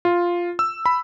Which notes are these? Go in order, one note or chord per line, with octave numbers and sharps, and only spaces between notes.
F4
E6
B5